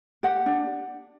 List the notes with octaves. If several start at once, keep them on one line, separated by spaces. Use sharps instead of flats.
G4 F#5
D4